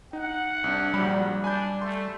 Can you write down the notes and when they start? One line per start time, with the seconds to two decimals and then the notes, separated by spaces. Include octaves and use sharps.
0.13 D#4 F#5
0.64 C2 D4
0.94 A#1 F#3 G3 B5
1.44 D4 G#5 B5 G6
1.81 A3 C6